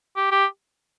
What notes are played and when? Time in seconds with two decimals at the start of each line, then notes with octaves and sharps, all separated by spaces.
0.16 G4
0.31 G4